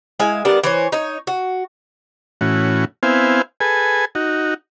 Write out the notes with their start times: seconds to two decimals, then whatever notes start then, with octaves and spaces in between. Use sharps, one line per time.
0.20 G#3 E4 F5 G#5
0.45 G3 B3 D4 A#4
0.63 E3 C5 C#5
0.92 D#4 C#5
1.27 F#4
2.41 A2 E3 C#4 F#4
3.03 B3 C4 E4 C5 F5 G#5
3.61 G#4 A4 B4 G#5
4.15 D#4 F#4